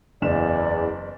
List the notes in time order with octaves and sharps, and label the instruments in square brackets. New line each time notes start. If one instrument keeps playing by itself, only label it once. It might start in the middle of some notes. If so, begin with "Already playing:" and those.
[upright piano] F#1 E7 [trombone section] E2 [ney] D5